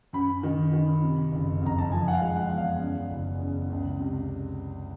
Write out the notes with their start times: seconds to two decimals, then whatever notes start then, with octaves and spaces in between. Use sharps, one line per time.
0.13 F#2 B5
0.43 D#3
0.73 D#3
1.03 C3
1.32 F#1
1.62 F2 A#5
1.79 A5
1.92 F3 G#5
2.08 F#5
2.13 F5
2.21 G#3
2.36 F#5
2.51 E2
2.58 F5
2.80 F#2
3.10 F#1
3.39 C#3
3.70 C#2
3.99 C3